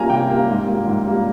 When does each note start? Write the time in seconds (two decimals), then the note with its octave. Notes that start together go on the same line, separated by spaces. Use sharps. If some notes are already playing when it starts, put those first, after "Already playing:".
Already playing: G3 A#3 G#5 A#5
0.09 C3 G5
0.30 G3 A#3
0.49 G#2
0.66 G3 A#3
0.86 G#2
1.06 G3 A#3